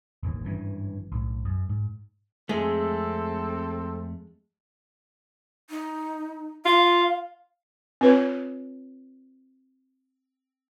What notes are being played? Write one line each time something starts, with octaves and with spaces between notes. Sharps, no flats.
E1 A1 D#2
G#1 G2 E3 C#4
B1 A2
F#2
G#2
F2 G#3 A3 C4 G#4 A4
D#4
F4 F5
C4 F4 B4 C#5